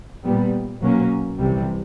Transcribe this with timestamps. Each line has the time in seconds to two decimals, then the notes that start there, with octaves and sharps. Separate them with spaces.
0.23 A#2 G3 B3
0.80 B2 F#3 A#3 C#4
1.38 C2 C3 E3 G3